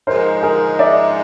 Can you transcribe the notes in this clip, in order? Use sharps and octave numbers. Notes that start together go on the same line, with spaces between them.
G#2 F3 G#3 A#4 C5
G#4 A#4
D5 E5